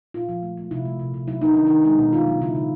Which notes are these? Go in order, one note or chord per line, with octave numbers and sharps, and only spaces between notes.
A#2 F4
F3
A3
A3
C3 E4
A3
C3
C3
F#3 E4
A#3 D#4
D#3 D4
D#3 D#4
G#3 D#4
B2
D#3 F4
F#3
C#3 E4
C#3